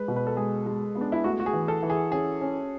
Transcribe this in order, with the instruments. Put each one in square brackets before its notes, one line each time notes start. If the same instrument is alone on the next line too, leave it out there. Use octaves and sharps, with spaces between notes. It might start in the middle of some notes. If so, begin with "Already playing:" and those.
Already playing: [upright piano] G#3 [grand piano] B4
[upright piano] B2
[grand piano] B4
A4
[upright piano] G#3 [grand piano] G#4
[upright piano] G#3
B3
[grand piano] D4
E4
[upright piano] A3 [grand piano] F#4
[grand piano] F#4
G#4
[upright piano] E3
[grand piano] A4
[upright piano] E3
[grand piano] G#4
[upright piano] C#4 [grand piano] G#4
[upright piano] C#4